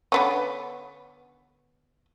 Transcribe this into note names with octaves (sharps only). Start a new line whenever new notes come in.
D3 B3 C#4